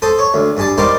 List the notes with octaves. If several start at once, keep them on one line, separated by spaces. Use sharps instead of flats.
A4 C5 D#6
C#5
D2
G2 G#4 A5
G3 D#4 A#4 C5 D5 F5